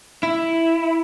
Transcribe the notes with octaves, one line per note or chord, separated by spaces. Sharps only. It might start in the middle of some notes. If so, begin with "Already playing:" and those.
E4